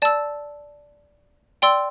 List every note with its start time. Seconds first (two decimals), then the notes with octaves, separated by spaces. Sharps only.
0.02 D5 A5 E6
1.62 D5 G5 C6 E6